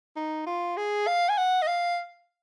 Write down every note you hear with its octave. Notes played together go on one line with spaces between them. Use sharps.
D#4
F4
G#4
F5
G#5
F#5
D#5
F5